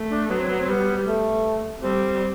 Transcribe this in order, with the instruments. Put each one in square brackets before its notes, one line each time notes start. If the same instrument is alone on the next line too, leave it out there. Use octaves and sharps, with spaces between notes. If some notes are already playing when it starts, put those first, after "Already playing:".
Already playing: [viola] A3
[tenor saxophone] D4
[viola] F#3 [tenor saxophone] B3
[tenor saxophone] C4
B3
C4
[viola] G3 [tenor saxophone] B3
[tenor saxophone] A3
[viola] G3 [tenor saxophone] C4